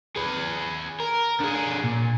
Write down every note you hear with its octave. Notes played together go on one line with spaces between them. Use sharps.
G#4 B4
A#4
D3 G#4
A#2